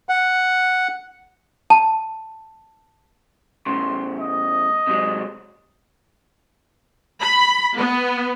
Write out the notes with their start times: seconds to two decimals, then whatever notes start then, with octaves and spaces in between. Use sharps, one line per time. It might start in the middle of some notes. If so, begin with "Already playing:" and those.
0.09 F#5
1.70 A5
3.66 A2 C#3 C6
4.19 D#5
4.87 C3 F#3 G#3
7.21 B5
7.76 B3